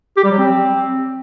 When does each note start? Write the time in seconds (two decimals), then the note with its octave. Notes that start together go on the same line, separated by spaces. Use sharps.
0.17 G4
0.24 G3
0.31 F#3
0.38 C4